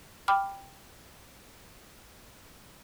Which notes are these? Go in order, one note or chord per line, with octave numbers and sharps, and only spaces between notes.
G5 B5 D6 F6